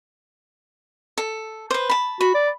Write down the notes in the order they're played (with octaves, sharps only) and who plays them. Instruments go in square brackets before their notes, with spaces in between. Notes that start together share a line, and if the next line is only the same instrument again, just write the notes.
[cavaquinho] A4
B4 C5
A5 B5
[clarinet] F#4 [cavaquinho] B5
[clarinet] D5